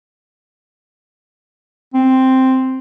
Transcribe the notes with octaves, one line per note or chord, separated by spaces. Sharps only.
C4